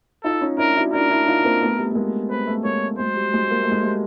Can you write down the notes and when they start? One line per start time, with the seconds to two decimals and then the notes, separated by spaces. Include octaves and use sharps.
0.24 D#4 F4 A4
0.41 C#4 D#4
0.58 D4 E4 A#4
0.76 E4 F#4
0.93 D4 E4 A#4
1.09 D4 E4
1.27 D#4 F4
1.44 A#3 C4
1.61 A3 B3
1.78 G3 A3
1.91 A3
1.95 G#3 A#3
2.30 A#3 C4 B4
2.47 A3 B3
2.64 G#3 A#3 C#5
2.98 F#3 G#3 C5
3.16 G3
3.33 F#3 G#3
3.51 A#3
3.62 A3
3.72 G#3
3.83 G3 A3